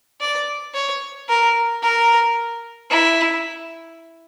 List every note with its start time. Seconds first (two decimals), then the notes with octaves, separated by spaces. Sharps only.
0.21 D5
0.74 C#5
1.29 A#4
1.83 A#4
2.90 E4